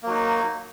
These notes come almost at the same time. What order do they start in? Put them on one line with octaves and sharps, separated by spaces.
A#3 F#3 D#4